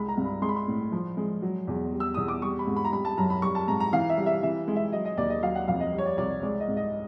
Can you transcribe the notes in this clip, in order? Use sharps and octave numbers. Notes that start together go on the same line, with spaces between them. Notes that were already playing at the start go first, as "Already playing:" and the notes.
Already playing: C2 G#3 B5
A#5
G2
B5
G#3 C6
B5
C6
A2
F3
G#3
F#3
E2
G3
E6
E2 D#6
D6
G3 C#6
B5
G#2
B5
A#5
G3 B5
A5
F#2 A#5
B5
G3 C#6
A5
G#2 A#5
A#5
E3 F5
E5
G3
E5
E3 E5
G#3
E5
F#3 D#5
D#5
D#2 D5
D#5
F#3 F5
F#5
F2 F5
D#5
G3
C#5
D5
C2 D5
G#3 D5
D#5
G#2
D#5